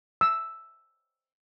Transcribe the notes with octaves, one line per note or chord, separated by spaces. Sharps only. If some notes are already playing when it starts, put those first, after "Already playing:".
E6